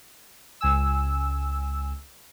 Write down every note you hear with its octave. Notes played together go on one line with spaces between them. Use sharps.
C#2 G#5 E6